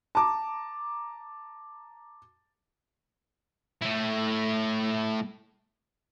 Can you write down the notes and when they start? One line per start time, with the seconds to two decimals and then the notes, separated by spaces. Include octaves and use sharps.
0.15 A5 A#5 D6
3.82 A3 E4